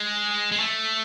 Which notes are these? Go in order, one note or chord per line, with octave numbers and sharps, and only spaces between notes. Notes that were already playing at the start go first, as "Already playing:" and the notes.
Already playing: G#3
G#3
A3